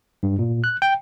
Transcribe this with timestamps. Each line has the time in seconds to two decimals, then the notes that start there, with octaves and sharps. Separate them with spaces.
0.23 G2
0.39 A#2
0.64 F#6
0.82 G5